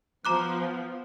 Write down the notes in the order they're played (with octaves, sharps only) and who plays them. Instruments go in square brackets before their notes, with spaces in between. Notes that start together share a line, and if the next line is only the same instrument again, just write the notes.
[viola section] F3 [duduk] B3 [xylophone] A#5 D6 F#6